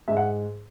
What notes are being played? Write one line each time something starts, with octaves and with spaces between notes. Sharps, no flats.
G#2 E5
F#5